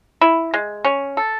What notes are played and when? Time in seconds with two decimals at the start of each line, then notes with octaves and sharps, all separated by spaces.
0.21 E4
0.54 G#3
0.85 C#4
1.17 A4